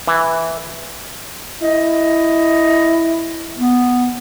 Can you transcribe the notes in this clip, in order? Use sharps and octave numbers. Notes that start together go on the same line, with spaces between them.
E3
E4 D#5
B3